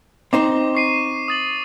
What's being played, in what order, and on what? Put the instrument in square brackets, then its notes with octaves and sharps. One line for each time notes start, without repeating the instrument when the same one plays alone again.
[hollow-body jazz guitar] C4 D#4 C5 [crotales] D6
[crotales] C#6 C7 D#7
D#6 A6 F#7